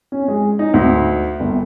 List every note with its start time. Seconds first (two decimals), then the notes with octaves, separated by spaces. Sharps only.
0.12 C#4
0.28 G#3
0.59 D#4
0.74 D2
1.40 G1